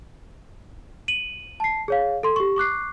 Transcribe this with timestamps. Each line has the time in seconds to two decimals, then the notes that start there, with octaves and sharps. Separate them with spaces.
1.08 D#7 F#7
1.60 A5 C7
1.88 G#4 C#5 F5
2.23 A4 C6
2.36 G4 C#6
2.56 C#6 D6 F#6 C7